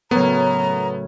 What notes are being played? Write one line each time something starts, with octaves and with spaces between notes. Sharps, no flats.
A2 C#3 F#3 A3 B3 A#4 A#5